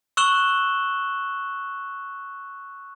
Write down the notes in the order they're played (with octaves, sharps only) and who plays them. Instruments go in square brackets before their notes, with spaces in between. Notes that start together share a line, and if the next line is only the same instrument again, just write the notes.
[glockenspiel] C#6 E6 F#6 E7 F#7 G7